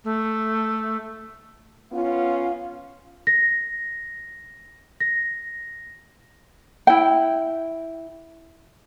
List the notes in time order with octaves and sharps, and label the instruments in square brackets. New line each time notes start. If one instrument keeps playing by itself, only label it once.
[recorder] A3
[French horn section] B3 C#4 F4 [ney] F5
[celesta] A#6
A#6
[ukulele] E4 G5